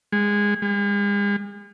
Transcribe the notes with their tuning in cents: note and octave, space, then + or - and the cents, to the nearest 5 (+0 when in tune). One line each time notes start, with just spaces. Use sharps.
G#3 -20
G#3 -45